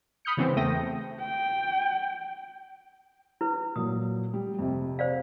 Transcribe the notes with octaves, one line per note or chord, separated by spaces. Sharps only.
B5 D#6 F6 G6 C#7
C#3 E3 G#3 B3 C4
E2 A3 G5 D#6 A#6
G5
E4 B4
A#2 F#3 D#6
G3
F2 C3
C5 D5 F5